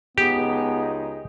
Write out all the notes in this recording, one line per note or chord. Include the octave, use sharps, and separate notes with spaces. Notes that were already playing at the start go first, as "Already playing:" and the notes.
C#2 B3 D#4 G4 G#4